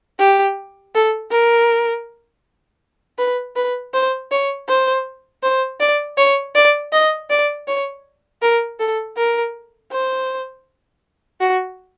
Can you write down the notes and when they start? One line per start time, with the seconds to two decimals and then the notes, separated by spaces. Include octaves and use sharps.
0.19 G4
0.95 A4
1.32 A#4
3.19 B4
3.56 B4
3.94 C5
4.31 C#5
4.68 C5
5.43 C5
5.80 D5
6.18 C#5
6.55 D5
6.93 D#5
7.30 D5
7.68 C#5
8.42 A#4
8.80 A4
9.17 A#4
9.92 C5
11.41 F#4